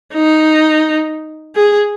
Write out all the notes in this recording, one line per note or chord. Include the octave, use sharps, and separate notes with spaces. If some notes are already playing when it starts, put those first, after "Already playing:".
D#4
G#4